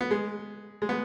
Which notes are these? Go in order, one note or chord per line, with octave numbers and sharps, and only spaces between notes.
B3
G#3
G#3
B3